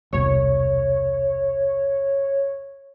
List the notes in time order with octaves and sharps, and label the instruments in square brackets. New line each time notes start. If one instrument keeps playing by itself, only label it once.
[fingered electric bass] E1 C2 [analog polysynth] C#5